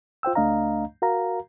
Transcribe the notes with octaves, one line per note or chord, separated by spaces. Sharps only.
F4 C5 G5 E6
C#2 A3 D4 D#5 F5 A#5
F#4 A#4 F5 A#5